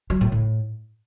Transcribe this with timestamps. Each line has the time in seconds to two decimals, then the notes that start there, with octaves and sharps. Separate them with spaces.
0.10 F#3
0.21 A2
0.32 A2